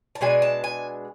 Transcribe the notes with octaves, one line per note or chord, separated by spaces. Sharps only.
A5
B2 G#3 D4 G#5
A5
G#5